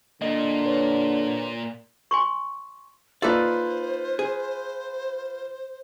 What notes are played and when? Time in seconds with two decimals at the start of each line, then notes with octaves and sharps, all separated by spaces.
0.22 A#2 D3 A#3 D#5
0.66 B4 C#5
2.11 G#5 C6 C#6
3.22 A#3 D#4 F4 A4 B4 C5 D5 E5
4.19 G#4